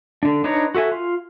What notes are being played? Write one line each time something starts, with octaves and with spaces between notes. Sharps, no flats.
D3 D4
D4 D#4 B4 C#5 A#5
F#4 A4 E5 G#5
F4